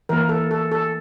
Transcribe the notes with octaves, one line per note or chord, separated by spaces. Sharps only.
E3 A#3 A#4
A4
A4
A4